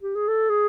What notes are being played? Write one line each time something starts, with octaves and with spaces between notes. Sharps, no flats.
G4
G#4
A4
G#4